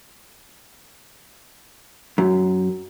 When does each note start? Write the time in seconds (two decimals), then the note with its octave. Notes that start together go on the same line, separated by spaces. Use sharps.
2.18 F#2